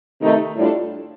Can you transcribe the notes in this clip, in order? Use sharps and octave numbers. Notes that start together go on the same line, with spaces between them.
C3 D#3 A3 C4 D#4
A2 G3 D4 F4 A4